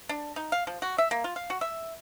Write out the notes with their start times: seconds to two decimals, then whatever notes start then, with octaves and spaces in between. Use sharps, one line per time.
0.09 D4
0.36 D#4
0.52 F5
0.67 F3
0.82 F#4
0.98 E5
1.11 A#3
1.24 F4
1.36 F5
1.50 F#4
1.61 E5